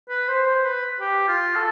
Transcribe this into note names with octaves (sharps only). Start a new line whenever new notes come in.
B4
C5
C5
B4
G4
F4
A4